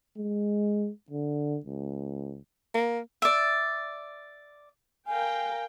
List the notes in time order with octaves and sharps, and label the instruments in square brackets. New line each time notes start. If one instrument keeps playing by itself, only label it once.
[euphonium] G#3
D3
C#2
[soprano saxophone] A#3
[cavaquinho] D5 E5
[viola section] A#4 F5 G5 [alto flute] G#5